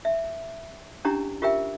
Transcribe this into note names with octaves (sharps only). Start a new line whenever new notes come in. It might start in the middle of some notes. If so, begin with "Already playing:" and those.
E5
C#4 D4 E4 G4 A#5
F4 G4 A#4 E5 G5